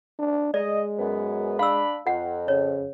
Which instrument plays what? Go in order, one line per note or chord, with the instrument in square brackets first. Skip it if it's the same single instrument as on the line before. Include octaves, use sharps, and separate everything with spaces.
[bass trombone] D4
[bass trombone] G#3 [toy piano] D5 [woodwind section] D#5
[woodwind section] F#2 B3
[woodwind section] D4 B5 [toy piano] F5 E6
[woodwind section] F2 [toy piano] F#5
[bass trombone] C#3 [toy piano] C#5